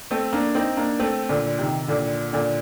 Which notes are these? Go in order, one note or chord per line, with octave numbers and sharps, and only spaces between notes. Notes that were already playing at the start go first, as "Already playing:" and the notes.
A3 C4
A#3 D4
C4 D#4
A#3 D4
A3 C4
A#2 D3
C3 D#3
A#2 D3
A#2 D3